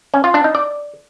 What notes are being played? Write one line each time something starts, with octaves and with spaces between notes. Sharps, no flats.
C#4
F4
D4
D#4
D5